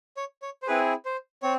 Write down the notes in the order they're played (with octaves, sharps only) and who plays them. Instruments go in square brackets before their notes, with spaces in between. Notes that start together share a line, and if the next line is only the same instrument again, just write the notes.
[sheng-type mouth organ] C#5
C#5
C5
C4 E4 G#4 B4
C5
C4 C#5